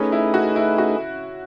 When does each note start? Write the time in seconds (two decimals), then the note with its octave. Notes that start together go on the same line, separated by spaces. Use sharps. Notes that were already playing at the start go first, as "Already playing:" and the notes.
Already playing: A3 C#4 D#4 G#4 B4 D#5
0.12 E4
0.34 F#4
0.56 E4
0.78 F#4